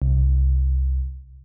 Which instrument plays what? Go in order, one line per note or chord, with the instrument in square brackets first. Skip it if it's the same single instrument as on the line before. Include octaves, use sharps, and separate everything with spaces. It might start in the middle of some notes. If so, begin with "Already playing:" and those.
[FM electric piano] C2